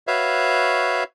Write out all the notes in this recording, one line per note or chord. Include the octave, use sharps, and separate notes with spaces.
F#4 B4 C#5 E5 F5